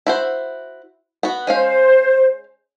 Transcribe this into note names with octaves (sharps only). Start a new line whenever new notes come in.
E4 F#4 C5
B3 F#4
G#3 C#4 C5 F5